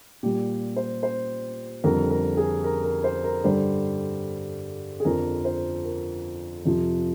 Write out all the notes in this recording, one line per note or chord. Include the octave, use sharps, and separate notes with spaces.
A#2 G3 G4
C5
C5
F2 D3 G3 A#4
A#4
G#4
A#4
A#4
C5
A#4
G2 D3 G3 C5
G#4
F2 D3 F3 A#4
C5
A#4
F2 C3 F3